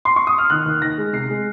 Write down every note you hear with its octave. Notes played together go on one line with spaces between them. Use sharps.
C6
C#6
D#6
F6
D#3 F#6
D#2
D#2 A#6
G#3
C3 C7
G#3